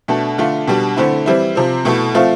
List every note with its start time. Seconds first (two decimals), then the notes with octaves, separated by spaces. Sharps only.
0.08 B2 A3 D4
0.38 D3 A3 D4 F4
0.67 B2 G3 D4
0.97 D3 A3 C4 E4
1.26 E3 G3 C4 E4
1.55 C3 F3 C4
1.85 B2 A3 E4
2.15 F3 A3 C4 F4